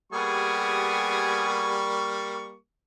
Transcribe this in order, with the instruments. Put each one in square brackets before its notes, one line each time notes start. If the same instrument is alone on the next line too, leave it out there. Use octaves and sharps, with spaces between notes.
[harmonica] G3 A#3 C#6 [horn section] B3 G4 G#4